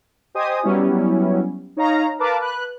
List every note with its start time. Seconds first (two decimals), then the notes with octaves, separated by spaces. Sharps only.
0.34 G4 C5 D#5 G#5 D#6
0.63 F#3 G3 B3 C#4 E4
1.76 D#4 C#5 D#5 F5 A#5
2.19 A#4 B4 F5 A5 D6
2.40 B4 F#6